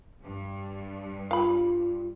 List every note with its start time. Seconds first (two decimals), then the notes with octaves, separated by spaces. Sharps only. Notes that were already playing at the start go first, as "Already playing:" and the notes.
0.24 G2
1.31 F4 F5 B5